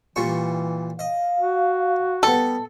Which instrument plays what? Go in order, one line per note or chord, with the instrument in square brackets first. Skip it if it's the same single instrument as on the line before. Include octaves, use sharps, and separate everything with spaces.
[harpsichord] A#2 G3 C#6 [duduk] E3
[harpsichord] D#5 [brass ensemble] F5
[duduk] F#4
[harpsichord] G3 B3 [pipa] A4